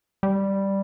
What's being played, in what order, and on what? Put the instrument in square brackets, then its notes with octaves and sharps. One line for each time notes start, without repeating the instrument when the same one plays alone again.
[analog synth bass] G3